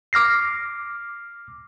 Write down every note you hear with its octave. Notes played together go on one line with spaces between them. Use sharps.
D6 F6 A#6 C7